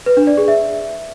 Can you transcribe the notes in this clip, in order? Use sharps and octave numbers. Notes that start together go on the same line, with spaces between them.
B4
D4
D5
G#4
E5